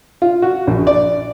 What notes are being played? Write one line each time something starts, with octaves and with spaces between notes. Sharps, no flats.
F4
F#4
A#1
D5